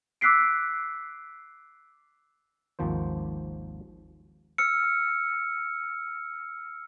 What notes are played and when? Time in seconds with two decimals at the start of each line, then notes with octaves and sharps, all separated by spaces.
0.21 D6 E6 F#6 B6 C7 D7
2.79 G#1 D#2 F3 A#3 C5
4.58 E6 F6 C#7